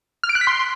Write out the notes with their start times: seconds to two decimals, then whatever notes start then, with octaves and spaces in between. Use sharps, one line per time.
0.23 F6
0.29 D7
0.35 F#6
0.41 B6
0.47 C6